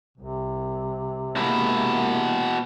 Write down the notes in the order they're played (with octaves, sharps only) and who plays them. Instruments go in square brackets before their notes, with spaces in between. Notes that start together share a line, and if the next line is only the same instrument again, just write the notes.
[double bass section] C2 [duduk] C3
[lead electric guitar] B2 E4 [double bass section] G#3 A#3